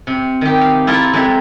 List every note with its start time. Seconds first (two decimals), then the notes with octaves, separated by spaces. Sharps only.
0.07 C3
0.41 D#3 G4
0.61 F5
0.87 E4 F4 A4 A#4
1.13 F2 G#3 E5